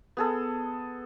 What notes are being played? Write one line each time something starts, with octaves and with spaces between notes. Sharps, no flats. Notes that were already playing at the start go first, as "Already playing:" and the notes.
B3 G#4 A4